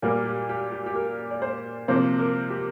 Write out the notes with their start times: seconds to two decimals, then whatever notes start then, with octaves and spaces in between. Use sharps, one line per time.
0.02 A#2 G3 A#3 A#4
0.25 G4
0.49 G4
0.72 G4
0.86 G4
0.95 A#4
1.31 D5
1.42 C5
1.88 C3 F3 A#3 C5
2.19 A#4
2.50 G4